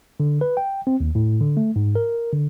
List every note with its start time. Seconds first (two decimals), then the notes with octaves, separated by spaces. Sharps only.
0.20 D3
0.41 B4
0.57 G5
0.87 C4
1.00 D#2
1.15 A2
1.41 D3
1.57 A3
1.76 G#2
1.95 A#4
2.33 D3